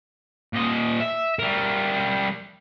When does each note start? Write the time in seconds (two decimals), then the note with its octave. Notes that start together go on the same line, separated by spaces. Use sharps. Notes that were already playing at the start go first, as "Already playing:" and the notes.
0.53 A#2 D#5
1.00 E5
1.39 G3 A#4